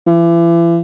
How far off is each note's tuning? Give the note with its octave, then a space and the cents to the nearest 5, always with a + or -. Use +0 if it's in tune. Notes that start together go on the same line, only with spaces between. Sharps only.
E3 +40